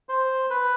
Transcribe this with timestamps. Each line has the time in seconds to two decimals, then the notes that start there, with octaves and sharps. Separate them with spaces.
0.09 C5
0.50 B4